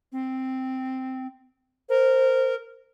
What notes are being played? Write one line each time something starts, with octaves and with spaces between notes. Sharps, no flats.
C4
A#4 C5